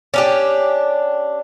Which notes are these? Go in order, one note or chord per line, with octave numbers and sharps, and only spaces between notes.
C#4 D4 G4